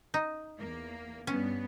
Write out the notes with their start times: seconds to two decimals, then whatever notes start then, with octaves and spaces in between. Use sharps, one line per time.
0.14 D#4
0.57 E2 A#3
1.27 G2 B3 C#4